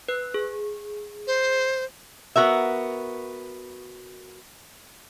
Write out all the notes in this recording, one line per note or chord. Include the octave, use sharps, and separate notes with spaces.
B4 F#6
G#4
C5
B3 F#4 A#4 E5